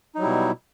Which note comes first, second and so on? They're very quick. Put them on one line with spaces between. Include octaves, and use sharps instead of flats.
D#4 F#3 G3 E4 B2